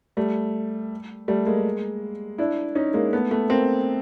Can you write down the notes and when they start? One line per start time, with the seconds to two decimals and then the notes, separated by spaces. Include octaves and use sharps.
0.17 G3 A3
1.28 G3 A3
1.46 G#3 A#3
2.38 D4 E4
2.75 C#4 D#4
2.94 G#3 A#3
3.13 A3 B3
3.31 A3 B3
3.50 A#3 C4